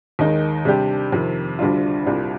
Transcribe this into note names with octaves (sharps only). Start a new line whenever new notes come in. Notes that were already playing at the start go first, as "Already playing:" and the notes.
D#2 D#3 G#3 D#4
C3 G3 D4 G4
F2 C3 D#3
D2 D3 G3 D4 F4
C2 A#2 G3 D4 F4